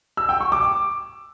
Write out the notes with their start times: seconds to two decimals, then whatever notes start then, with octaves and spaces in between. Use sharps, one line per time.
0.17 E6
0.29 G5
0.40 C#6
0.52 D6